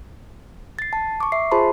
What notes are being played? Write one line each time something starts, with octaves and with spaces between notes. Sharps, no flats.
A6 C7
A5
C#6 D6
E5 C7
F4 G#4 C5 A5 B5 C6